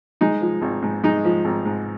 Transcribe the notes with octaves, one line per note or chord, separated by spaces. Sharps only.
G#3 D#4
F3
G#1
G#2
G#3 D#4
F3
G#1
G#2